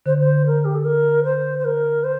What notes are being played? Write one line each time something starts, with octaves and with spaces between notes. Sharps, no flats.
D3 C5
C5
A#4
G4
A4
A#4
C5
C5
A#4
C5